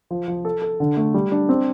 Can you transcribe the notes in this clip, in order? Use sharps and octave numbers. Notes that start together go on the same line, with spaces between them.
F3
F3
A4
A4
D3
A3
G3
D4
C4